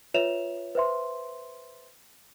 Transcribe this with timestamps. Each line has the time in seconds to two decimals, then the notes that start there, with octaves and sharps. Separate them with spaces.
0.14 F4 B4 C#5 E5 E7 F7
0.75 B4 C5 E5 C6